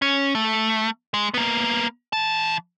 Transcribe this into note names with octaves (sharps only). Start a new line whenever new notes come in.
C#4
A3
G#3
A#3 B3
E3 A5